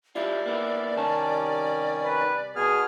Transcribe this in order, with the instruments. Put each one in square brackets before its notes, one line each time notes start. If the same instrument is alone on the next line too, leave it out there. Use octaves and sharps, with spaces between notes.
[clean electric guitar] G3 E4 F4 [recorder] D5
[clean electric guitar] A#3 B3 E4
[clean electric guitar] C2 A5 [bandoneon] D#3 C#4
[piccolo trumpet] B4
[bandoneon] B2 B3 F6 [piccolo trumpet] G#4